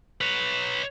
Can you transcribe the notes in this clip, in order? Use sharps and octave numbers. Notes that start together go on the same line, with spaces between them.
B4 C#5